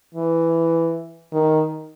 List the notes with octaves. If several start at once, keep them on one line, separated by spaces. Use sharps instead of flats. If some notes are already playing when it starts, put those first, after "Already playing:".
E3
D#3